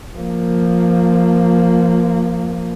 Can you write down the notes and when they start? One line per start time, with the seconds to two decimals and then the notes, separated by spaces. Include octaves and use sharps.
0.15 F3 A#3